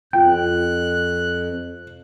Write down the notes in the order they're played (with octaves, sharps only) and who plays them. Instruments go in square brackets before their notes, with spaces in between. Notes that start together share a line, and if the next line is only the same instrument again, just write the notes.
[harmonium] F2 [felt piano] F4 [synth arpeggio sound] G5 [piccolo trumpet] F#6